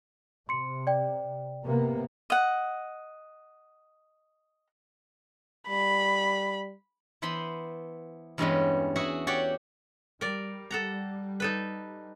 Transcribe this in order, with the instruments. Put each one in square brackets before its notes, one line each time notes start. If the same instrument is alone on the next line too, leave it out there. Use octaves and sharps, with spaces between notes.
[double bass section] C3 [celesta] C6 C#7
[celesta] D5 G5
[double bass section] C3 A#3 B3
[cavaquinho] D#5 F#5
[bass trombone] G3 [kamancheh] B5
[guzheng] E3 B3 C5 B5 C6
E2 G2 G3 G#3 C#4 B4
F#4 G#4 E5 F#5
F#4 G4 C#5 D5 F#5
[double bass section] G3 [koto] A#4 D5
[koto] A4 F#5 A#5
D#4 A4 B4